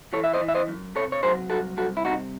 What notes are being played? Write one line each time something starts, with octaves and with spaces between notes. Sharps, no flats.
E3 A4 C#5
E5
C5 D#5
E3
E5
C5 D#5
F#2
C3 A4 C#5
C#5
F#3 G#4 C5
C2 F#4 A4
C2 F#4 A4
E4
C3 D#4 F#4